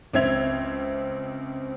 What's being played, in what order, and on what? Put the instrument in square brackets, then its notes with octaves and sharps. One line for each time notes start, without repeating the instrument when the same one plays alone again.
[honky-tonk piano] C#2 C4 E5 G#6 F7